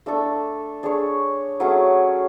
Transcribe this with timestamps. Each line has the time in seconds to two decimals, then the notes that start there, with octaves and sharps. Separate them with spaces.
0.06 A3 D4 A4
0.83 D4 G#4 C#5
1.60 F#3 A3 C#4 G#4